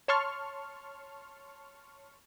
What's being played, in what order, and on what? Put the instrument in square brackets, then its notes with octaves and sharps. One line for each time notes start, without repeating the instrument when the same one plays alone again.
[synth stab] C#5 A5 C6 C#6 F6